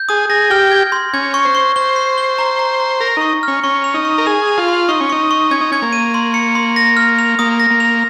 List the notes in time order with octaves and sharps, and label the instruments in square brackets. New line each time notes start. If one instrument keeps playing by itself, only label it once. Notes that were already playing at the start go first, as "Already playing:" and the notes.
Already playing: [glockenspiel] G6
[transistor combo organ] G#4 [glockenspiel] D#6
[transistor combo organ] G#4 [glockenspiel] A#6
[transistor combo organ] G4 [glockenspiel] F6
[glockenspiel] G#6
C6
[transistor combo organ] C#4 [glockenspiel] G#6
[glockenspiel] C#6
[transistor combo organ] C5
[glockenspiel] C#6
[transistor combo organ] C5 [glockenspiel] G7
[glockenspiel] C7
G7
A#5
A#5
A#5
[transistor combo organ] A#4 [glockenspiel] A#6
[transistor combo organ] D#4 [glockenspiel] C#6
[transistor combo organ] C#4 [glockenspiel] F6
[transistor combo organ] C#4 [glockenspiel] C#6
[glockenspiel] F7
[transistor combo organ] D#4
[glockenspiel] C#6
[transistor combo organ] A#4
[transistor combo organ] G#4 [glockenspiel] F7
[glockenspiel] F7
[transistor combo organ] F4
[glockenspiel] C6
[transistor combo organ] D#4 [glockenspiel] C#6
[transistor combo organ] C#4
[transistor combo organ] D#4 [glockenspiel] C#6
[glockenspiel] C#6
[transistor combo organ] C#4 [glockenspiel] G#6
[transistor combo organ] D#4
[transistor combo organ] C#4 [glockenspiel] G#6
[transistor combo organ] A#3
[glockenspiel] D#7
C6
C#7
C6
A#6
F6
F7
[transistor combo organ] A#3 [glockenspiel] D#6
[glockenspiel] A#6
[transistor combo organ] A#3
[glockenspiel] F7